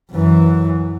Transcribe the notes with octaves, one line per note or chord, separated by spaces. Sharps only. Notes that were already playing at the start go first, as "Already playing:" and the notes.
F#2 E3